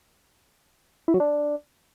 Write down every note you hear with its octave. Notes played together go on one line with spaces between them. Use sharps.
E4
F#3
D4